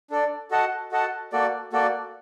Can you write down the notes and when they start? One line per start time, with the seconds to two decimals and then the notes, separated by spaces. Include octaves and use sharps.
0.10 D4 A4 D5
0.51 F#4 A4 D#5 F#5 A5
0.92 F#4 A4 D#5 F#5 A5
1.32 A#3 F#4 A4 D5
1.73 A#3 F#4 A4 D5